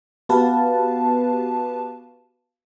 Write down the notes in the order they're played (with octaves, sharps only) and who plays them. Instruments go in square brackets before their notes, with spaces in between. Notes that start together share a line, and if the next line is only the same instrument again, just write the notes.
[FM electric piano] B3 F#4 G4 B4 F5 A5